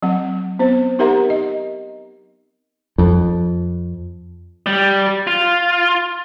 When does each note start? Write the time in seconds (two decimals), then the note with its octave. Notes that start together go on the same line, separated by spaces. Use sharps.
0.02 F#3 C4 F#5
0.59 B3 C4 C5
0.99 D#4 G4 A#4 E5 F#5 A#5
1.30 D#5
2.98 F2
4.66 G3
5.27 F4